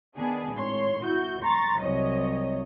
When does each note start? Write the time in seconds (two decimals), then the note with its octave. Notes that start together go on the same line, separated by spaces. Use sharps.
0.17 D#3 B3 D4 G#4
0.55 G#1 A2 C#5 C6
1.04 E4 F#4 G6
1.43 A#5 C6 C#6 A6
1.81 C2 F#3 C#5 D#5